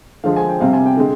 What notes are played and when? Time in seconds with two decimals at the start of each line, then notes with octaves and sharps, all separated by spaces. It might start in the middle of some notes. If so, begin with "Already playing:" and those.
0.24 D3 F3 G#3 F5
0.36 G#5
0.49 G5
0.60 C3 G3 F5
0.73 G#5
0.86 G5
0.97 D3 G#3